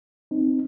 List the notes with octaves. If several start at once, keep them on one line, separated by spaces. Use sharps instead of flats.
C4 D#4